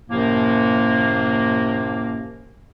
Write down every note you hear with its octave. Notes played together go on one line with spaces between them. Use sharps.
F#2 A2 C3 F3 A#3